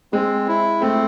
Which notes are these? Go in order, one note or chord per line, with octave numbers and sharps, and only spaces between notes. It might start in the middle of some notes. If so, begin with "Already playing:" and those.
G#3 C4
E4
A3 C4